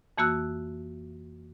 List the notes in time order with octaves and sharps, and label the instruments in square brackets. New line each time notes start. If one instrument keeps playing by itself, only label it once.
[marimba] F2 E3 A#3 F#4 E6 F#6